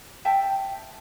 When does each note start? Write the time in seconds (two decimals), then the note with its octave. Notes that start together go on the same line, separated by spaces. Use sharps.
0.25 E5 G5 A5